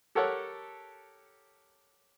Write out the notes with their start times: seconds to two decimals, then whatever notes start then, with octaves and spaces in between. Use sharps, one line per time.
0.15 G4 A4 A#4 C#5 F#5